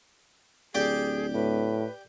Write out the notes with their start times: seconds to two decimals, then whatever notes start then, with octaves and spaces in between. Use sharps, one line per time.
0.75 D1 G4 G#4 D5 G5
1.34 A2 B4